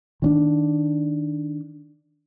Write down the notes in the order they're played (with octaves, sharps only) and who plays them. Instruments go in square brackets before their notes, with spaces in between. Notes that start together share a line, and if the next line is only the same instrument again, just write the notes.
[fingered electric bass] D#3 C#4 D4